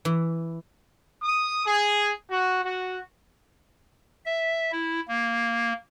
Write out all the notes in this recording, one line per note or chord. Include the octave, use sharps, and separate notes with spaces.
E3
D#6
G#4
F#4
F#4
E5
E4
A#3